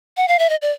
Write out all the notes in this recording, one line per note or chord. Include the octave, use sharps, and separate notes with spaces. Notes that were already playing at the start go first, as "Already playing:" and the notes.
F#5
F5
E5
D#5
D5